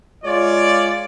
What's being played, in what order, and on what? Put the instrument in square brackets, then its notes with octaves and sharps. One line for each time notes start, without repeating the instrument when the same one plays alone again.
[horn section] G#3 F4 C#5 D5